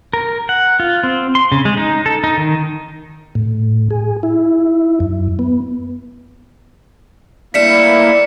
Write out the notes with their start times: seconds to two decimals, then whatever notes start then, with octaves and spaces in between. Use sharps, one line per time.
0.13 A#4
0.49 F#5
0.80 F4
1.03 C4
1.35 C6
1.52 C#3
1.65 G#3
1.77 D#4
2.06 A4
2.24 D#4
2.37 D#3
3.35 A2
3.91 G#4
4.23 E4
5.00 F#2
5.39 B3
7.54 G3 A3 A#3 D4 E4 B6 C#7 E7